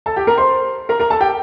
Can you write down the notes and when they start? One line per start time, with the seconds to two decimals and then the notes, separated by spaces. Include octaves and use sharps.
0.06 A4 A5
0.16 G4 G5
0.27 A#4 A#5
0.38 C5 C6
0.89 A#4 A#5
1.00 A#4 A#5
1.10 A4 A5
1.20 G4 G5